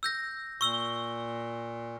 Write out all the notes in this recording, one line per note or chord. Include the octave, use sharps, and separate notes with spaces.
E6 G6 A#6
A#2 C#6 E6 G7